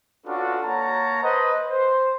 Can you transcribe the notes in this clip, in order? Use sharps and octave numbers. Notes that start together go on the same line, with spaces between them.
C#4 D4 F4 F#4 A4 B4
A#3 C#5 F#5 A5 A#5
B4 C5 D#5
C5